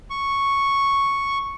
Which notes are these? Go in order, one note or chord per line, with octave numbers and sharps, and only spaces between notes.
C#6